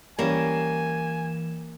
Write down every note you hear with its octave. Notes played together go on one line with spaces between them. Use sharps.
E3 G3 A#3 C#4 G#5 E7